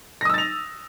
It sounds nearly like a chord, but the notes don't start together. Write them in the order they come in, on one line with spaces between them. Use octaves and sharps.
A#6 D#6 E6 A6 F7